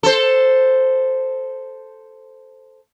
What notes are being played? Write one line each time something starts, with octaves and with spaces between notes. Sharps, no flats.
A4 C5